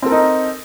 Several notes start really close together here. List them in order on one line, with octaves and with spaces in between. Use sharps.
C4 A4 A#4 D#4